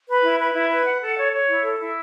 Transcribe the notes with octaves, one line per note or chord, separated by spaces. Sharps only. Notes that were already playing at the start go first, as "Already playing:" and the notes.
B4
E4
B4
E4
B4
F#5
A4
C#5
C#5
E4
A4
E4